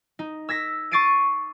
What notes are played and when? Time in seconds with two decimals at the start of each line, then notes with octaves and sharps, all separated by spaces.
0.19 D#4
0.49 E6 G#6 A#6 B6
0.91 C#6 D6 A6 C7 D7 D#7